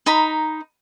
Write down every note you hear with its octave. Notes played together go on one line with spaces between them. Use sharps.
D#4 A#5 B5